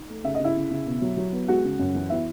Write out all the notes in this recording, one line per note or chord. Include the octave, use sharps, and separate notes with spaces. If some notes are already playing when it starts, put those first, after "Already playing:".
Already playing: D#4
A3
C#3 E5
D#5
C#3 E4 E5
C#3
C#3
B2
F#3
F#3
B3
G#3 F#4 F#5
C#3
F#2
E3
B3 E4 E5